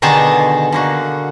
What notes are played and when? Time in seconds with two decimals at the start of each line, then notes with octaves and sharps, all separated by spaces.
0.02 B2 D3 D#3 D#4 G#4 A5
0.72 D3 A#3 F#4